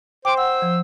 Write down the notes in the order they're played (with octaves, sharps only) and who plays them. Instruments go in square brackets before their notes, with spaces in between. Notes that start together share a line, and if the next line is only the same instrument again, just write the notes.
[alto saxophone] C5 [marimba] G5 C6 [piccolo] D6
[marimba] F#5 [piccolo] E6
[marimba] F3